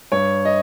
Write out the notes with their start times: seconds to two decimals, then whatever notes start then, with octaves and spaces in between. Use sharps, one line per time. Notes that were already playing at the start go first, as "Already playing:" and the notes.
0.12 G2 C#5
0.45 D#5